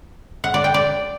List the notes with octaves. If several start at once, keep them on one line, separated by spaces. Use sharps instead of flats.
F#5
D5
G5
D5